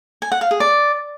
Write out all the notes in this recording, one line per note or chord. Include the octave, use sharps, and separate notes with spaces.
G#5
F#5
F5
G#4
D5